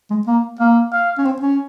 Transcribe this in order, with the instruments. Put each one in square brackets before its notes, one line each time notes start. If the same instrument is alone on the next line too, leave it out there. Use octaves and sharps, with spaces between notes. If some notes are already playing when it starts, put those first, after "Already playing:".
[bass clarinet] G#3
A#3
[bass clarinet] A#3 [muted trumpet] F5
[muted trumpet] F5
[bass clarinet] C#4
C4
C#4